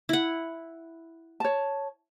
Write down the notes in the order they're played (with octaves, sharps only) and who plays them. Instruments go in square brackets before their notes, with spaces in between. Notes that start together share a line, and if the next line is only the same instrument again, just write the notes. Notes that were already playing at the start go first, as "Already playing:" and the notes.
[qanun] E4 F#5
[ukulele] C#5 A5